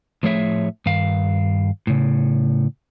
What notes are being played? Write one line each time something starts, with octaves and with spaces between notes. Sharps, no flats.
A2 F3 A3 G#4 C#5 E5
G2 D#3 F5
A2 C#3